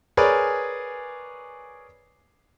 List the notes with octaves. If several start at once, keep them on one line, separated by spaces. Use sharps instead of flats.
G#4 A#4 B4 C#5 D5 G#5